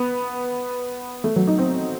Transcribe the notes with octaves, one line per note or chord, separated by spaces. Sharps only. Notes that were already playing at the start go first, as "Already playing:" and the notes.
Already playing: B3
A3
F#3
D#4
C4